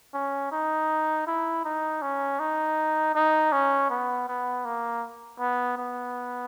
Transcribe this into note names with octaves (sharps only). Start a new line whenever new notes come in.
C#4
D#4
E4
D#4
C#4
D#4
D#4
C#4
B3
B3
A#3
B3
B3